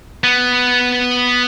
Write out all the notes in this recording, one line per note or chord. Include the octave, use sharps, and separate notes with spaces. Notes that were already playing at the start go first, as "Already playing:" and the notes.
B3